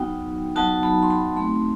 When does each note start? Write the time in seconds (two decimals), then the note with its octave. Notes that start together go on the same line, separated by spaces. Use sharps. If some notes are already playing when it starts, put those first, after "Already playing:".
Already playing: F#3 B3 D#4 F#4 G5
0.56 F#3 B3 D#4 F#4 A5
0.83 B5
1.03 C6
1.10 B5
1.36 A3 C4 D#4 F#4 C6